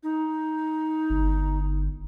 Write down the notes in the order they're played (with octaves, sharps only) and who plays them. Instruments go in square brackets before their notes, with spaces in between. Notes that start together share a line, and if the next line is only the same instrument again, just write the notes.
[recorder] D#4
[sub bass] G1